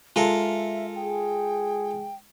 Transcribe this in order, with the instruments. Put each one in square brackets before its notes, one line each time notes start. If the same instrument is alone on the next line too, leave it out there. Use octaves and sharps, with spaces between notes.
[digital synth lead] G#3 [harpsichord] F4 A4 A#4 [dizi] E5
[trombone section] G#4 [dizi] G5